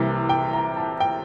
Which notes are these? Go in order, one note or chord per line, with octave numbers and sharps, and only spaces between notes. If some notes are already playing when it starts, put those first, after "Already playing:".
Already playing: C2 C3 E3 G3 A#3
G5
A#5
A5
G5